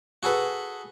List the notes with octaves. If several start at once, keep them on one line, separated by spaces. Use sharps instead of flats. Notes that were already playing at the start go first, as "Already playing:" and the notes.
F#4 G#4 A4 B4